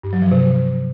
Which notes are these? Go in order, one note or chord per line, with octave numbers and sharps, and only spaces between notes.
G2
F#3
F3
C3